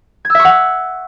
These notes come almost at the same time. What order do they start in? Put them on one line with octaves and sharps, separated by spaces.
G#6 E6 E5 C#6 F#5